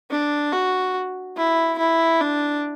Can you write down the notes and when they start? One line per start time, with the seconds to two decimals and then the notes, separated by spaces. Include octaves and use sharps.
0.11 D4
0.52 F#4
1.37 E4
1.78 E4
2.21 D4